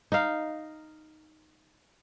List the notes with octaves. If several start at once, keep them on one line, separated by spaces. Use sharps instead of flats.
D#4 F5